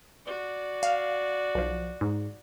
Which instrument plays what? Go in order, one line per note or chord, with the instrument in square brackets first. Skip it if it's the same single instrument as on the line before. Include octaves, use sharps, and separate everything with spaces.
[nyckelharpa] F#4 D5
[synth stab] F5
B1 F3
G#2